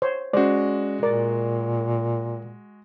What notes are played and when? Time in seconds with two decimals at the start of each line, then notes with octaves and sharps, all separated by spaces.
0.02 C5 C#5
0.33 G#3 C#4 F#4 C5 D5
1.03 A#2 A#4 D5